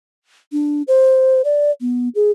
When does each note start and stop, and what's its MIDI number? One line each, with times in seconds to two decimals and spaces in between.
0.52 0.83 62
0.88 1.42 72
1.45 1.71 74
1.81 2.09 59
2.15 2.31 68